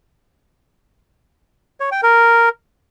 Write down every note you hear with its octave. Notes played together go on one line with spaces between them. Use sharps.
C#5
G5
A#4